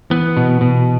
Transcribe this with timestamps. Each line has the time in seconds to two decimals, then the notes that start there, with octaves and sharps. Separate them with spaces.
0.10 E3 B3
0.37 B2
0.61 B2